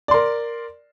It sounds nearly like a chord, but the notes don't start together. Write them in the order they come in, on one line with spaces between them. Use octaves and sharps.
D5 C6 A#4